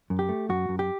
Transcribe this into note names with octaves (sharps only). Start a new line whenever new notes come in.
F#2
G4
A3
F#2 F#4
F#2
G4